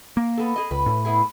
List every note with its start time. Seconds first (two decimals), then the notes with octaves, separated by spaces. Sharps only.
0.17 A#3
0.37 B3 A4
0.56 G#4 D#5
0.71 C#2 B4
0.86 A2
1.05 B3 E4 G#4